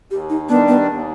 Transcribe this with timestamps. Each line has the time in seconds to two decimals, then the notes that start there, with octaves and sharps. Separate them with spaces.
0.10 D#2 G4
0.30 D#4
0.49 D#3 G3 B3 D4
0.68 B3
0.88 D#2